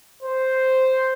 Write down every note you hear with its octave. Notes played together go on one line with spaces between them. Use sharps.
C5